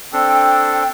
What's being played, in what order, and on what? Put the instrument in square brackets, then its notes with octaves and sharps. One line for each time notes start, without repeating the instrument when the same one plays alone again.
[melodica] C4 D4 A4 [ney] G5